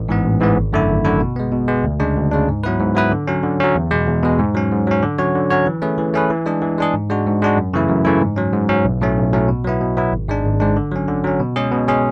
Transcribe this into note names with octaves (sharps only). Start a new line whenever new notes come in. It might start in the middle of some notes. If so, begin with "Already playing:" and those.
Already playing: A1
G#2 E3 B3
A1
G#2 E3 B3
G#1
F#2 D3 A3 E4
G#1
F#2 D3 A3 E4
B2
G#3 B3
B2
G#3 B3
D2
C#3 G#3 D4
D2
C#3 G#3 D4
G#2
F#3 B3 E4 B4
G#2
F#3 B3 E4 B4
D3
F#3 C#4
D3
F#3 C#4
E2
B2 G#3
E2
B2 G#3
G#2
F#3 C#4
G#2
F#3 C#4
D3
F#3 C#4 F#4 C#5
D3
F#3 C#4 F#4 C#5
E3
A3 C#4 G#4 B4
E3
A3 C#4 G#4 B4
E3
G#3 D4 G#4
E3
G#3 D4 G#4
G#2
G#3 D4 F#4
G#2
G#3 D4 F#4
F#2
C#3 E3 A3 E4
F#2
C#3 E3 A3 E4
G#2
F#3 C#4
G#2
F#3 C#4
B1
A2 F#3 A3 C#4
B1
A2 F#3 A3 C#4
B2
F#3 B3 E4
B2
F#3 B3 E4
G#1
G#2 G#3 D4
G#1
G#2 G#3 D4
D3
F#3 C#4
D3
F#3 C#4
B2
G#3 C#4 G#4
B2
G#3 C#4 G#4